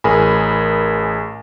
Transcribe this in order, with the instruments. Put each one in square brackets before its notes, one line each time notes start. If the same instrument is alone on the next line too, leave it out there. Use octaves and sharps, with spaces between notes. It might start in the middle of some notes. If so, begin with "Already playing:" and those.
[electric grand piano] A1 G#4 A#4 G#5 B5